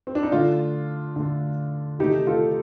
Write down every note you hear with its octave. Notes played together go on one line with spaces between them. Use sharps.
C4
D4
D#4
D3 A3 D4 F4
D3 A3
C3 D#3 A3 D#4 G4
F4 A4